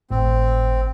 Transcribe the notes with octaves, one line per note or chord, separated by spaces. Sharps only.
G#1 A2 C4